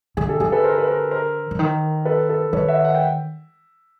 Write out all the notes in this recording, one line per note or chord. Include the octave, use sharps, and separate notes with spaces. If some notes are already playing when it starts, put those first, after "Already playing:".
D3 G#4
G4 A4
D3 G#4
A4 B4
A#4 C5
B4
A#4 C5
A#4 C5
D3
D#3
A4 B4
A4 B4
D#3 B4 C#5
E5 F#5
F#5
G5